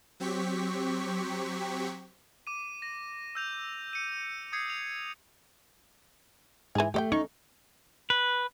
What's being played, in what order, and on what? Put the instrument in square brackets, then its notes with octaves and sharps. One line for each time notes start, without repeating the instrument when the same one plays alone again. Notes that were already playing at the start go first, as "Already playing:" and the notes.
[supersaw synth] F#3 C4 G4 C#6 B6
[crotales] D6 D#7
A#6
E6 G6 F7
C#7 D#7
D#6 G6 G#6 C7 C#7
F7
[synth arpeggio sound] G#2 G#5 [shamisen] E3 G#4
[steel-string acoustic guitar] A3 [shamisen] G4 D#5 G5
[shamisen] C#4 [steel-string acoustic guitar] D#4 [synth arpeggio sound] C#6
[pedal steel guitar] B4